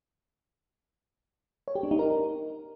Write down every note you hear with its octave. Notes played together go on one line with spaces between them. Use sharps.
C#5
G4
D4
D#4
A#4